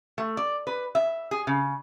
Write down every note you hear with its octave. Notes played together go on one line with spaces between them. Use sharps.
A3
D5
B4
E5
G#4
C#3